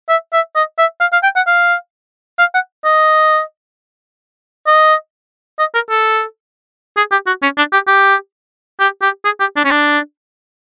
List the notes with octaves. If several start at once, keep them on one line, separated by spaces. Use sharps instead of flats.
E5
E5
D#5
E5
F5
F5
G5
F#5
F5
F5
F#5
D#5
D#5
D#5
A#4
A4
G#4
G4
F#4
C#4
D4
G4
G4
G4
G4
G#4
G4
D4
C#4
D4